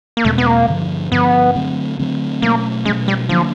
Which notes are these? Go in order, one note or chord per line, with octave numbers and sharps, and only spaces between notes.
A#3
E2 B2 G#3 A3 C4
B3
A#3
G2 D3 F3
G2 D3 F3 B3
D3 F#3 A3 C4
D3 F#3 A3 C4
B2 F#3 A3 A#3 C#4
B2 F#3 G#3 A3 C#4
G3
D3 F3 F#3 A#3 D4